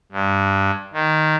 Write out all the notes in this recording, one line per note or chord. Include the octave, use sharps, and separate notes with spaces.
G2
D#3